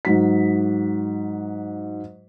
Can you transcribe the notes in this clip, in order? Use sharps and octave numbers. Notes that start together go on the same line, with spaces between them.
G#2 F#3 B6